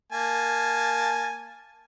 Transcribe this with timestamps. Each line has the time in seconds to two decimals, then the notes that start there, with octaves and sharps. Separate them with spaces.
0.12 A#3 G#5 A5